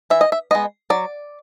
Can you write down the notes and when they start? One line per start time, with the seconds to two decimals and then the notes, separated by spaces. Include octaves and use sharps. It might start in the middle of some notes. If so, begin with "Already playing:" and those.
0.10 E3 E5
0.21 D#5
0.32 E5
0.51 G#3 B3 D#5
0.90 F#3 D5